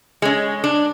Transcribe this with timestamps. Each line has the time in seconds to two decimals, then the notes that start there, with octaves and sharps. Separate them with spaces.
0.22 G#3 C#4
0.64 D4